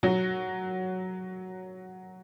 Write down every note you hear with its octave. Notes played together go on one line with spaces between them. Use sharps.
F#3 F#4